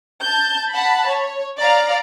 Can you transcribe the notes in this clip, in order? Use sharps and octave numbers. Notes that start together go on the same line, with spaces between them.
A5 G6
F#5 A5 B5
C#5
D5 F5 A#5